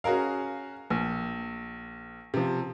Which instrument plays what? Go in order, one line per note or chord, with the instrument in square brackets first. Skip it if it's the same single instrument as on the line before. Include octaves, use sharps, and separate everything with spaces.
[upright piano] C#4 F#4 G#4 A#4 F5
A#1
C3 F3